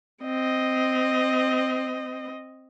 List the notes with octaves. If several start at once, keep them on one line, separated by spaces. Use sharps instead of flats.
C4 D#5